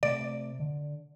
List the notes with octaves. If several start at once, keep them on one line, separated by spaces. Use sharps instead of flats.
C3 A3 D5
D3